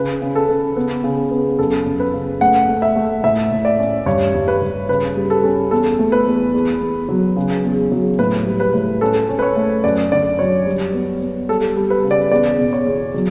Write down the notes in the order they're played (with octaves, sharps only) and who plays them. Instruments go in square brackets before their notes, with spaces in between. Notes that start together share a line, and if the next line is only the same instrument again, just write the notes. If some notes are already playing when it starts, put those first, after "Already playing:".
Already playing: [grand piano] C#3 B4
C#3
A4
C#3
B3
C#3
B3
F#2 A4
F#2
B4
C#3
A3 F#5
A3
E5
A3
A2 E5
A2
D5
C#4
G2 C#5
G2
B4
G2
C#3 B4
G3
A4
C#4
E2 A4
A3
B4
E2
E2
E2
F#3
C#3
E2
F#3
A2 B4
G3
B4
A2
C#4 A4
C#4
B4
C#5
A3
F#2 D5
D3 D5
F#3 C#5
G3
B3
B3
G3 A4
G3
B4
C#3
D5
E2 D5
B2
C#5
E2
F#3